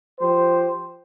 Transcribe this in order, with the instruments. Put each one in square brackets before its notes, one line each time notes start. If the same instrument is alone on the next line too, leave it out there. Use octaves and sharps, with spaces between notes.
[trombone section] F3 G4 C5